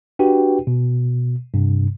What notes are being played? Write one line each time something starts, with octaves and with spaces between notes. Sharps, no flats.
D4 F#4 G4 B4 G5
B2
G2 C3